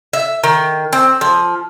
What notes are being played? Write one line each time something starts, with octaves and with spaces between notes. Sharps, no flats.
E5
D#3
C4
F3